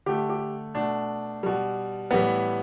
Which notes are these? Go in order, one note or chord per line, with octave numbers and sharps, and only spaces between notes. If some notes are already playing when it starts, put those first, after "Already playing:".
D3 A3 G4
G4
B2 A3 D4
B2 G3
A2 E3 G3 B3